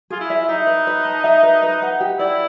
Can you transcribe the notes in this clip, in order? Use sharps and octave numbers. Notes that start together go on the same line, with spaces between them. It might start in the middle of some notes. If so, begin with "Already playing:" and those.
F4 G#4
E4
E5
D#4 E5
B4
B4
A5
E5
B4
B4
F#5
G4
E4 D5